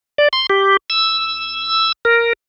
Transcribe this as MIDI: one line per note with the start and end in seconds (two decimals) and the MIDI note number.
0.18 0.28 74
0.33 0.46 84
0.50 0.77 67
0.90 1.92 88
2.05 2.33 70